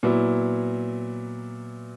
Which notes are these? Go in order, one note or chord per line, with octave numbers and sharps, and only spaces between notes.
A#2 F#3 B3 E4